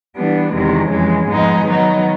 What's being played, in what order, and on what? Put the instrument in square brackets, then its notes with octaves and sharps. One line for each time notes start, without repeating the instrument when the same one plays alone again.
[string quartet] E3 G3 B3 D4
E2 C3 D#3 G#3
F2 C#3 E3 G#3
G#2 F3 G#3 B3 D#4
D#3 F#3 B3 D#4